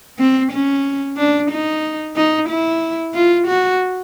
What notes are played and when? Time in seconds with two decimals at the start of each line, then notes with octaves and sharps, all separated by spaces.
0.19 C4
0.52 C#4
1.17 D4
1.51 D#4
2.16 D#4
2.49 E4
3.14 F4
3.47 F#4